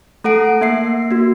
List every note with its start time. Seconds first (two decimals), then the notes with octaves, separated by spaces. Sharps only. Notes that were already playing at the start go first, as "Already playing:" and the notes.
0.24 A3 A4 F#5 D7
0.61 A#3 E5 C7
1.11 A#3 F#4